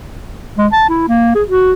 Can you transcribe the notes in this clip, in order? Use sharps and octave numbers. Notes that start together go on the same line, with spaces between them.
G#3
A5
E4
A#3
G#4
F#4